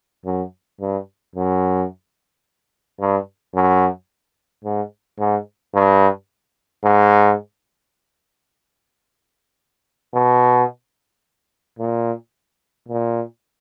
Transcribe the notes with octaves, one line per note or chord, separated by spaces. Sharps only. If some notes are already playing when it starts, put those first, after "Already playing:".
F#2
G2
F#2
G2
F#2
G#2
G#2
G2
G#2
B2
A#2
A#2